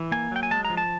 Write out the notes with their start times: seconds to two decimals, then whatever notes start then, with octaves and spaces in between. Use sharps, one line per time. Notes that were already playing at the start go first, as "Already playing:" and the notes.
Already playing: E3
0.12 A#3 G#5
0.32 F#3 G5
0.43 G#5
0.51 G#3 A5
0.65 A#5
0.70 F3
0.77 A5